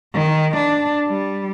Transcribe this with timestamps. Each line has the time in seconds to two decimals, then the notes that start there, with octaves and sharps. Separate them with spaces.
0.14 D#3
0.57 D4
1.07 G3